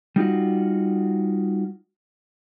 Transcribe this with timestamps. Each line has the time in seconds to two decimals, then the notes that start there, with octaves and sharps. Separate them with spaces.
0.16 G3 D#4 F4 F#4